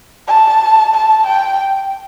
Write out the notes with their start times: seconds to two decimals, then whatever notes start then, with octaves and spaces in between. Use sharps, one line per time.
0.28 A5
0.94 A5
1.27 G5